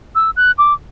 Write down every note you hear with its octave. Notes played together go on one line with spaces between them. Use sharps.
E6
F#6
D6